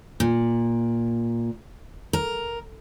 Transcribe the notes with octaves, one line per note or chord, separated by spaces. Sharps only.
A#2
A#4